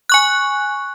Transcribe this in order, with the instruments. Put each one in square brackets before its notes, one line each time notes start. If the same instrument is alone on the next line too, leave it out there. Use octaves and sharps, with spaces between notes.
[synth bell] G#5 C#6 F#6